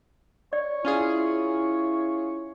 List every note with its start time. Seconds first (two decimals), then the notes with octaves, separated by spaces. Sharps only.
0.53 C#5 D5
0.85 C#4 E4 F4 G#4